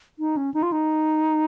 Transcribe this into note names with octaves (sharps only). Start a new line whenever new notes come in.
D#4
C#4
D#4
F4
D#4